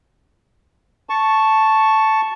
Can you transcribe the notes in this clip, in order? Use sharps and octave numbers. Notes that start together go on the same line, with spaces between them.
A5 C#6